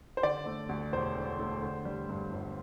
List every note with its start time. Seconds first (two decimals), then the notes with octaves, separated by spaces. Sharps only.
0.17 C5
0.23 D3 D5
0.46 A3
0.69 D2
0.92 E1 C5
1.16 D3
1.39 A3
1.62 D3
1.85 G3
2.09 G2
2.31 G1